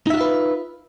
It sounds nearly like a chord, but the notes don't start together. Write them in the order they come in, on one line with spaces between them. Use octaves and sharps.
D#4 E5 F#4 F4 B4